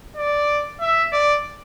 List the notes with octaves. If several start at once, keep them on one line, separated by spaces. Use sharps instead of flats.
D5
E5
D5